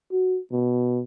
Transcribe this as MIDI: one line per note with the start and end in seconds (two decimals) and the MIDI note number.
0.11 0.38 66
0.52 1.02 47